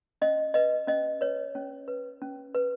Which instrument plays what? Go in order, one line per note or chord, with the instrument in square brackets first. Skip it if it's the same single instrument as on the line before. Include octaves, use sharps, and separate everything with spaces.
[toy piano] C#4 D#5
B4 D#5
C#4 D#5
B4 C#5
C#4
B4
C#4
B4